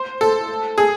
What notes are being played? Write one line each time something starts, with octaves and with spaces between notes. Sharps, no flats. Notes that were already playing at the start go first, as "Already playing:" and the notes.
Already playing: C5
A4
G#4